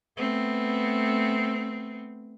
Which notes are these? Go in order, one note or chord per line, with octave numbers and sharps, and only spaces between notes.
A3 B3 C4